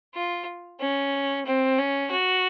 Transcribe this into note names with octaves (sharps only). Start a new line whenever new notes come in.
F4
C#4
C4
C#4
F#4